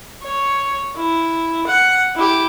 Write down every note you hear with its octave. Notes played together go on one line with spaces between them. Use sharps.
C#5
E4
F#5
E4 G4